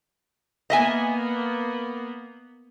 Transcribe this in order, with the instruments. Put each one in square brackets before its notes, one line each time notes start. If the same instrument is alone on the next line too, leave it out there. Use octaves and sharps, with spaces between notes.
[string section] A#3 B3 [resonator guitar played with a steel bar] D#5 E5 G#5